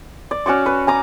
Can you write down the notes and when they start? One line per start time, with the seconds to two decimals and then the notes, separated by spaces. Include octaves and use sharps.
0.31 D5
0.46 C#4 F#4 D5 C#6
0.66 B4
0.87 G#5 A#5 D6